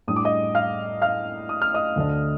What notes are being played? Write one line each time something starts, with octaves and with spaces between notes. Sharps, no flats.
A2 G3 D4 D#6
D6
D#5 D#6
F5 F6
F5 F6
D#6
F6
D#5 D#6
D2 D3 A3 D4